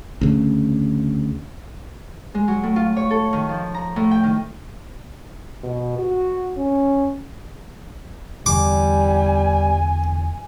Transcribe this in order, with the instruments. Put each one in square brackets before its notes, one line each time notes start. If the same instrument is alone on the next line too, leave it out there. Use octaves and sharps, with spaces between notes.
[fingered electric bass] D2 C#3
[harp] G#3
F#3
A2
F4
C#5
A4
D#3
F3
A#5
A2
G5
D#3
[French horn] B2
F#4
C#4
[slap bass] E2 D3 E3 [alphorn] G3 [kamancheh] G#5 [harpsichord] D6